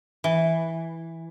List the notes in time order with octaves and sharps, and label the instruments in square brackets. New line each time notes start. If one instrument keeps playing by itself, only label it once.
[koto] E3